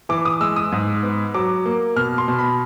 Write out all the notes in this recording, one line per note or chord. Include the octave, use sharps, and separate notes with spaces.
E3 D6
D#6
G#3 E6
D#6
G#2
B3
F#3 D6
A#3
B2 F6
C6
B2
B5